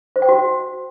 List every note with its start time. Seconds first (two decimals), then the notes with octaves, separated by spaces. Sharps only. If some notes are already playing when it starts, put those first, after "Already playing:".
0.16 C5
0.22 G5
0.29 F#4